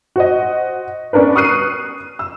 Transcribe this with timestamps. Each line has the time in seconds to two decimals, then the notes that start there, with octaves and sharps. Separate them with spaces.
0.16 F#4 C5 D#5
1.13 B3 C#4 D4 A#4 B4
1.36 C#6 D#6 F6 F#6 C7 D#7
2.19 E6